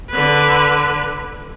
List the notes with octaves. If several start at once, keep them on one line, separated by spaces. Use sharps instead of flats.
D3 B4